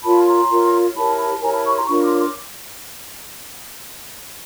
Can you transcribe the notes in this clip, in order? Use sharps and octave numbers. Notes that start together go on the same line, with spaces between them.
F4 A#4 C#5 A5 B5
A#5 C6
F4 A#4 C#5
E4 G4 A#4 C#5 A5 B5
A5 B5
E4 G4 A#4 C#5 G#5 A#5
A5 B5
B5 C#6
A#5 C6
D4 F4 A#4 C#5 B5 C#6
C6 D6
C6 D6